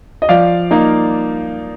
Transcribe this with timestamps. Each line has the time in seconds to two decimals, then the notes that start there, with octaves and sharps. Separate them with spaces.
0.22 D#5
0.29 F3 D5 F5
0.71 A#3 D#4